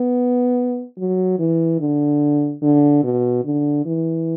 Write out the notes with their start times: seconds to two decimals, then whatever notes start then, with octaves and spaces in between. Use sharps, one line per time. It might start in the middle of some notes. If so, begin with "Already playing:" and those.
Already playing: B3
0.98 F#3
1.39 E3
1.80 D3
2.62 D3
3.03 B2
3.45 D3
3.86 E3